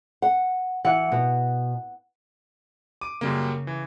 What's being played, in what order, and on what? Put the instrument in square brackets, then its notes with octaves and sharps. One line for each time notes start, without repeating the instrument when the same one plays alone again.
[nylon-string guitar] F#5
[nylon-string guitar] E3 [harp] F#5
[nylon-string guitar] B2
[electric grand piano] D6 [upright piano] D#7
[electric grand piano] F#2 G3 A#3 [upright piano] C#3
[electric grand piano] E3